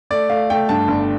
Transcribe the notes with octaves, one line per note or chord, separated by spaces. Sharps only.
A3 D5
A3 F5
A3 G5
G2 A5
G1